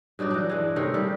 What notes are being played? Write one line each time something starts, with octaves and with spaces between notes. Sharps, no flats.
G2 F#3 D#4 D5
E3 D4
E3 G#3
C3 D#3 A3 C#5
C3 G3